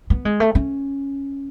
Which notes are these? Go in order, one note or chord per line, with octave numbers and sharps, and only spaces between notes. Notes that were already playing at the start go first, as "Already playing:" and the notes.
B3
G#3
A3
C#4